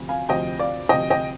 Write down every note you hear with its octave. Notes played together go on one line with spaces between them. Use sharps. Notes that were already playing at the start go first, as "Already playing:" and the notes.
Already playing: D2 C3 F3
F5 G#5
D2 C3 F3 D#5 G5
D5 F5
D2 C3 F3 D#5 G5
D#5 G5